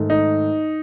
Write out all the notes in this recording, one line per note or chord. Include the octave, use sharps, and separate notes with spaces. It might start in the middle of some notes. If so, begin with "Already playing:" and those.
Already playing: G#2 D#3 A3
D#4